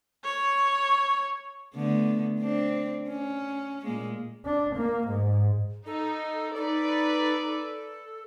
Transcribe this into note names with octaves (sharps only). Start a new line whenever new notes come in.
C#5
D3 A3 B3
C4 D4
C#4
A#2 G#3 A#3
D4
A#3
G#2
D#4 A4
D#4 A4 B4 D5